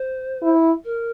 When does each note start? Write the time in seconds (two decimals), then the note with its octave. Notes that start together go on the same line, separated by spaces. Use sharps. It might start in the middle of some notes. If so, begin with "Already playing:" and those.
Already playing: C5
0.42 E4
0.84 A#4